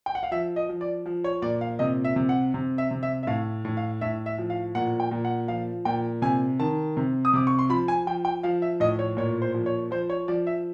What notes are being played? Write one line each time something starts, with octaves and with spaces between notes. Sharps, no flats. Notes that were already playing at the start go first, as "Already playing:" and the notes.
G5
F#5
F5
F3 E5
D#5
F3
D5
F3
C#5
A#2 D5
F5
C3 D#5
E5
C3
F#5
C3
E5
C3
E5
E5
A2 F5
A2
F5
A2 E5
E5
F3
F5
A#2 F#5
G5
A#2
F#5
F3 F5
A#2 G5
C3 G#5
D#3 A5
C3
D#6
C3 D6
C#6
C6
F3 B5
G#5
F3 G5
G5
F3 F5
E5
A2 D#5
C#5
A#2 C#5
C5
F3
C#5
F3 C5
C#5
F3 D5
E5